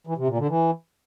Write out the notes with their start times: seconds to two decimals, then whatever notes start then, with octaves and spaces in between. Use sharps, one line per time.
0.07 E3
0.17 C3
0.28 A#2
0.38 D3
0.49 E3